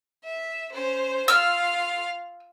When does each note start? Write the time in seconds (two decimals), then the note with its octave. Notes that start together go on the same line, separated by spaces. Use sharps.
0.24 E5
0.72 C#4 C5
1.28 F4 F5 E6 F6